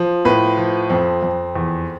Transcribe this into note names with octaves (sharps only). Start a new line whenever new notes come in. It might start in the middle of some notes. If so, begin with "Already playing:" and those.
Already playing: F3
A2 B4
F3
F2 C4
F2
E2